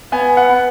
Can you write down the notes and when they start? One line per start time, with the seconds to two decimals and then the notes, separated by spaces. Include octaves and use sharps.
0.12 B3 G#5
0.37 F#5
0.49 B3